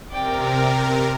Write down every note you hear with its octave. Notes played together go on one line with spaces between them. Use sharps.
C3 A#4 D5 G5